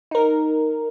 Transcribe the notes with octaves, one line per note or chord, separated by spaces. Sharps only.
D#4 A#4